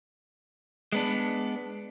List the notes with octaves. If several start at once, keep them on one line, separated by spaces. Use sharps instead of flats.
G#3 B3 D4